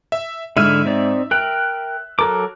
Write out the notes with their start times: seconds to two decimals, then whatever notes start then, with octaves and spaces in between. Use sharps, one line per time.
0.12 E5
0.57 G#2 D3 E4 E5 F6 D#7
0.86 C4 D#4 D5
1.31 A#4 G5 F#6
2.19 F#3 A4 A#4 D6